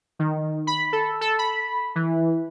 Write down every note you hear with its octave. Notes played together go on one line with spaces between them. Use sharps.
D#3
B5
A4
A4
B5
E3